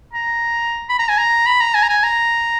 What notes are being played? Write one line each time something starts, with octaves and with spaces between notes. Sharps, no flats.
A#5
B5
A#5
G#5
A#5
B5
A#5
G#5
A#5
G#5
A#5